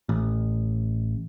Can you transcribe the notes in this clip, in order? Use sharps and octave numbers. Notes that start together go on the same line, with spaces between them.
A1